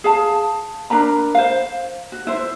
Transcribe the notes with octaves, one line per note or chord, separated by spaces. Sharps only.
G#4 F5 A5
D4 A#4 A#5 B5
C5 F5
F#4
E4 C5